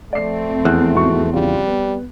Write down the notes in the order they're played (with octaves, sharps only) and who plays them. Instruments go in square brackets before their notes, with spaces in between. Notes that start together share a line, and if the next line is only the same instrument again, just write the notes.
[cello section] F2 C4 [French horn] A3 [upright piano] D5 C7
[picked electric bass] E2 [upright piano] F#6
[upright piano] G#2 F#4 C#6
[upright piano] C#3 F4 [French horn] G3
[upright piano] B3